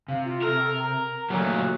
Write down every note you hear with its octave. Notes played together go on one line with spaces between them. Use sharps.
C3 F5
F4
A4 A#4
A#5
A#2 F#3 G3 A3